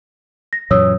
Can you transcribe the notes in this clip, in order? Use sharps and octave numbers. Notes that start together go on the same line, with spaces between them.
A#6
F#2 A#2 E3 C#5 D#6 E6